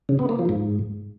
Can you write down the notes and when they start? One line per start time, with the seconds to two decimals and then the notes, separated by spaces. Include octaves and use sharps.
0.09 C#3
0.19 B3
0.29 A#3
0.39 F3
0.49 G#2